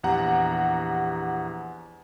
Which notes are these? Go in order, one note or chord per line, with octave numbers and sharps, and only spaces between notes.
A#1 E2 G4 F#5 A#5